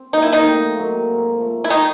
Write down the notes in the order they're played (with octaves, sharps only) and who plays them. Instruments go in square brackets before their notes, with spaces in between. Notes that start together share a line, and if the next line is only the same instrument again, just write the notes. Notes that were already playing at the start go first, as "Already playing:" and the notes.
Already playing: [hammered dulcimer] C4
[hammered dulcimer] F#3 A#3 [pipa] D#4
[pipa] E4
D#3 D#4
[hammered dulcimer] A2
F#3 A#3
G#2
F3 A3
[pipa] E4
D#3 D#4